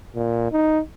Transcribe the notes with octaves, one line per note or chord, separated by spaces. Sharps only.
A#2
D#4